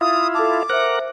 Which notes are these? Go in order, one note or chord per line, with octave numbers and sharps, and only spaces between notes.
E4 F4 D#6
A4 A5 D6
A#4 C5 E5 F#5